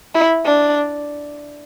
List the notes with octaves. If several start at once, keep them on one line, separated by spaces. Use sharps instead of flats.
E4
D4